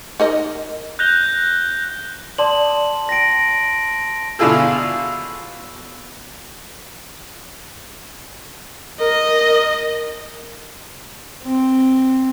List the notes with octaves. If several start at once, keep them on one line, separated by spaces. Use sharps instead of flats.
D#4 A#4 D#5
F#6 G6 A#6 F7 G7
D5 A5 C6 D6 D#6 F#7
F5 G5 A#6 D7
B2 D3 E4 F4 G#4 A4
A#4 D#5
C4